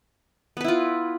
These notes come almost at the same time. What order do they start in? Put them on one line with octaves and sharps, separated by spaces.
B3 B4 E4 F4